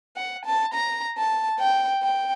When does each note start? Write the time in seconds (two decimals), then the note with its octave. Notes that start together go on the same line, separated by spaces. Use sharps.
0.16 F#5
0.46 A5
0.74 A#5
1.17 A5
1.59 G5
2.03 G5